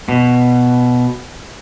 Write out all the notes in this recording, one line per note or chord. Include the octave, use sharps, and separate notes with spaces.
B2